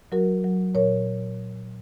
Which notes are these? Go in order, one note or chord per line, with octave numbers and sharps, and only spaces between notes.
F#3 F#4 A#4
F#3
A#2 A#4 C#5